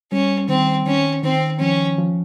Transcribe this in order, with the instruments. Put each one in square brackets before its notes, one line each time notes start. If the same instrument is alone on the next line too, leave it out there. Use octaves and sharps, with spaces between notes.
[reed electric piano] G3 [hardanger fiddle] C#4
[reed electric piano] D#3 [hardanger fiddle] C4
[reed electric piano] D#3 [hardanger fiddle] C#4
[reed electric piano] D#3 [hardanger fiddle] C4
[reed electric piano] F3 [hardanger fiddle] C#4
[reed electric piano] F3